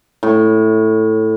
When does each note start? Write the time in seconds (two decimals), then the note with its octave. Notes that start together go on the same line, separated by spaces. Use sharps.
0.23 A2